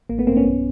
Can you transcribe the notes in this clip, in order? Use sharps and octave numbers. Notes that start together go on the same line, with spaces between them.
A1 A#3
A3 B3
G2 A#3 C4
B3 C#4
B1